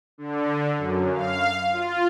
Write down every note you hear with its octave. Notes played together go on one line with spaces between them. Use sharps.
D3
F#2
F5
F4